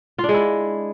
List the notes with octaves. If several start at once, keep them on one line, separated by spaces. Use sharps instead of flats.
F4
D4
G#3
E4